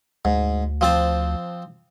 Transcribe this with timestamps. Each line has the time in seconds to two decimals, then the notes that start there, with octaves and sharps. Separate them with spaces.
0.25 D2 G#2
0.81 F3 C4 A5